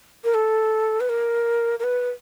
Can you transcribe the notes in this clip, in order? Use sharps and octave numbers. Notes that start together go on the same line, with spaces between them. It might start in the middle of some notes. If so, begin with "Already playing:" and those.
A#4
A4
B4
A#4
A#4
B4